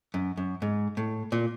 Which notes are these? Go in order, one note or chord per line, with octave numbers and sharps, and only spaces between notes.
F#2
F#2
G#2
A2
A#2